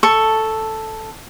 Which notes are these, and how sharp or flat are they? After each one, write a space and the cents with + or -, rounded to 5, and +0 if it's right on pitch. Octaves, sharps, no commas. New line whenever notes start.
A4 +0 C#6 +0